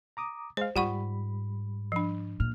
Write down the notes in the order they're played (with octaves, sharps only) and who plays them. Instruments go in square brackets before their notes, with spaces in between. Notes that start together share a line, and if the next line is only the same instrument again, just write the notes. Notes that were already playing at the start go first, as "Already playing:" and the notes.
[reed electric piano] A#5 D6 D#6
[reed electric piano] G#3 F5 [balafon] C5
[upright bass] G#2 [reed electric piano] G3 B5 [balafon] F4 F#5 C#6
[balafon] F3 D4
[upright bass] A#2 [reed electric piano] F6